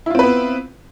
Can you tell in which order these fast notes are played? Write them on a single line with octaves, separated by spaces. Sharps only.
E4 F4 C4 B4 B3